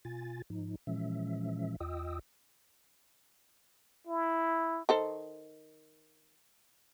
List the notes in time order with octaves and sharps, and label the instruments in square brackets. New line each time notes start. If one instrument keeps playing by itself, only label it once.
[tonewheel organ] B2 F4 G#5 A6
G#2 F3 D#4
A#2 E3 F3 G#3 C#4 E5
E2 F4 D#5 G5 D#6 E6
[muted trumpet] E4
[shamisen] D#3 A4 C5